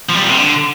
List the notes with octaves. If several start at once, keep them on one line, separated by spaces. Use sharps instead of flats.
F3
G3
A#2
C3
D3